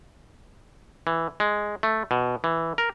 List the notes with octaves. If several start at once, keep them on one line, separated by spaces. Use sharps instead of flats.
E3
G#3
A3
B2
E3
A#4